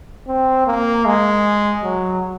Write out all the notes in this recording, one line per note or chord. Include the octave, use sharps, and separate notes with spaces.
C4
A#3
G#3
F#3